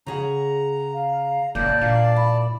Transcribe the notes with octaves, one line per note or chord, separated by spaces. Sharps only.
C#3 G#4 F#5 A#5
F5
F#1 A#2 A#3 D5 A5 G6
A#2 D4 F5
E4 B5